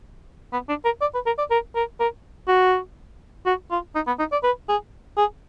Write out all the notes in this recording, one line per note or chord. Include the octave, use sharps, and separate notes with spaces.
B3
D4
A#4
D5
B4
A#4
D5
A#4
A#4
A#4
F#4
F#4
F4
D#4
B3
D#4
D5
B4
G#4
G#4